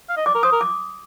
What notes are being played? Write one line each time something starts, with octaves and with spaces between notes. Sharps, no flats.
F5
D#5
D5 D6
A#4
C5 D#6
A#4
D6